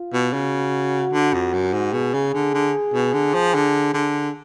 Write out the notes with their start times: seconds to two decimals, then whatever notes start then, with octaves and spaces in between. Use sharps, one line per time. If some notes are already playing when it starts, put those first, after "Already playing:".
Already playing: F4
0.13 B2
0.33 C#3 F#4
1.13 D3
1.34 F2
1.53 F#2
1.73 G#2
1.93 B2 G#4
2.14 C#3
2.34 D3
2.54 D3
2.94 B2
3.14 D3
3.34 F3
3.55 D3
3.94 D3